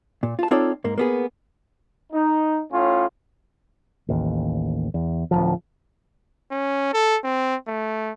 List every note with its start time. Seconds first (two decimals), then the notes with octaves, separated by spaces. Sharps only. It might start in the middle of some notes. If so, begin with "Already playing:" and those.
0.23 A#2
0.39 F4 A5
0.51 C4 D#4 F4 A4 C#5 D5
0.84 G#2 A#3
0.98 A#3 B3 G#4
2.12 D#4
2.71 A2 C#4 F4
4.09 A1 D#2
4.94 E2
5.31 D1 G1 F3
6.51 C#4
6.93 A4
7.24 C4
7.67 A3